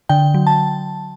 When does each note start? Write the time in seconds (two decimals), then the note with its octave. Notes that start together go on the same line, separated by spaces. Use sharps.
0.09 D3 G5
0.34 F#3
0.47 A5